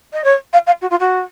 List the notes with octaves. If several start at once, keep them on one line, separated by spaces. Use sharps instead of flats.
D#5
C#5
F5
F5
F#4
F4
F#4